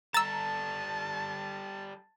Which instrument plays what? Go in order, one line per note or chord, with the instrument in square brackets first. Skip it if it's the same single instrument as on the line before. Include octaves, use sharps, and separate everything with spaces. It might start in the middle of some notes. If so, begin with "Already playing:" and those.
[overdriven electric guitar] G3 A4 [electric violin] A5 [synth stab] A#5 [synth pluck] E6 A6